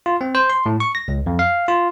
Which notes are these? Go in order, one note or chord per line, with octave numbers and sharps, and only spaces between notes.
F4
C4
C5
C6
A2
C#6
A#6
C#2
F2
F5
F4